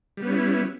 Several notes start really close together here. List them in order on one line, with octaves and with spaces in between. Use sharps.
G3 B3 C#4 E4